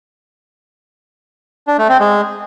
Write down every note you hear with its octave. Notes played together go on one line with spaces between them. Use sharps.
D4
A3
C4
G#3